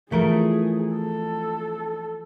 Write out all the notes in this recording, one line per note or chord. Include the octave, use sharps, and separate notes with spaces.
E3 F3 A3 G#4 A#4
A4